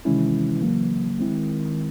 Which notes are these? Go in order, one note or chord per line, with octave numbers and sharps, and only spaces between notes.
C3 D#3 E3 G#3 C#4 E4
C#3 F#3 A#3
D#3 G#3 C4 E4